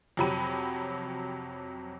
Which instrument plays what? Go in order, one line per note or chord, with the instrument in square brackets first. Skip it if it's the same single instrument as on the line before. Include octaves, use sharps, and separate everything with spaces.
[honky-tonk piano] F2 C3 F#3 G4 B5 D#7